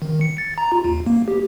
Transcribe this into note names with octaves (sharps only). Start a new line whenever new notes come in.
D#3
C#7
A6
A#5
F4
D#2
A#3
G4